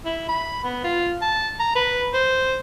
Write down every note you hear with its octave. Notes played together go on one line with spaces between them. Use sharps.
E4
B5
B3
F4
A5
A#5
B4
C5